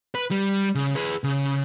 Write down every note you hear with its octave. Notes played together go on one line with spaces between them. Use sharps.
B4
G3
C#3
G#4 B4
C#3